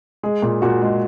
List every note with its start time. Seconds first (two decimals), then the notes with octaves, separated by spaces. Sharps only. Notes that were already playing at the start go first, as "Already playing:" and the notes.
0.23 G#3 G#4
0.42 A#2
0.62 A#2 F#4
0.82 G#3